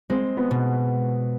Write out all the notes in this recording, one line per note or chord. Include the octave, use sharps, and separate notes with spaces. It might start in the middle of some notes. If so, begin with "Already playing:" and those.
G#3 C4
B3
B2